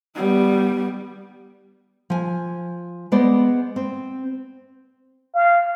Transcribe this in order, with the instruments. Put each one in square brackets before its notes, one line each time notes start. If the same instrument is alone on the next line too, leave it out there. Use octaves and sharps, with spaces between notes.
[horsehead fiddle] G3 B3
[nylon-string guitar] F3 G#5
G#3 B3 C5 D5
C4
[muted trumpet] F5